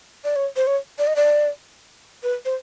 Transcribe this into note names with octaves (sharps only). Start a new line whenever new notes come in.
D5
C#5
C5
C#5
D5
D#5
D5
B4
C5